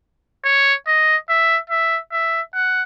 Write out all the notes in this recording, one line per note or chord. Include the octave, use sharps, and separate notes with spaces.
C#5
D#5
E5
E5
E5
F#5